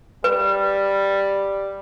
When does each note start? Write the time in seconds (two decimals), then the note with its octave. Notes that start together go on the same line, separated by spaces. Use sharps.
0.24 G3 B4